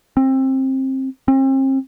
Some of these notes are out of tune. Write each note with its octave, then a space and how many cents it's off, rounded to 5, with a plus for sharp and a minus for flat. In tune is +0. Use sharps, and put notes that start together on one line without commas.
C4 +20
C4 +40